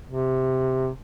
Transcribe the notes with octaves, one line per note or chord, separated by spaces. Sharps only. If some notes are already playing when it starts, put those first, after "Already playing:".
C3